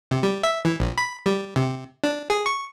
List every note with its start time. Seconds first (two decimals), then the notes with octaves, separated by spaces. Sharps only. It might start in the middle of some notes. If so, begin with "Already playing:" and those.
0.11 C3
0.23 G3
0.43 E5
0.65 E3
0.80 A#1
0.98 B5
1.26 G3
1.56 C3
2.04 D4
2.30 G#4
2.46 C#6